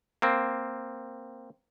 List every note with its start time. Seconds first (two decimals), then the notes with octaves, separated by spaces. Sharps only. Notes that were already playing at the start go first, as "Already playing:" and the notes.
0.22 A#3 C4